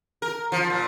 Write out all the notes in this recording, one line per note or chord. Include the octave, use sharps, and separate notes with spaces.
A#4
F3
A#2